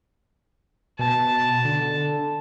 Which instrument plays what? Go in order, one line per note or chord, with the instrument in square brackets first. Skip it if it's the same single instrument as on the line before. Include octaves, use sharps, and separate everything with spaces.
[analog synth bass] B2 [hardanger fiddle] A5
[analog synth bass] D3